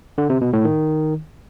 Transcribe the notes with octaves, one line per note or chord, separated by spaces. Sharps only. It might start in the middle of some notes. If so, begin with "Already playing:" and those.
D3
C3
B2
A2
D#3